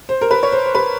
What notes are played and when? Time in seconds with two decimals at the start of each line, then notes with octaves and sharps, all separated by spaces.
0.09 C5
0.21 A#4
0.31 B4
0.43 C#5
0.52 C5
0.66 C5
0.75 B4